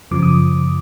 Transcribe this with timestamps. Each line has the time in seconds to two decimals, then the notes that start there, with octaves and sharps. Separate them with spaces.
0.11 F#2 C#3 F3 D6
0.23 D#6